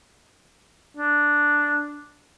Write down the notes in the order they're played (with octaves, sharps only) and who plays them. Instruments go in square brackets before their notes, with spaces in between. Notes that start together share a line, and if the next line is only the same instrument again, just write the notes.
[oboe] D4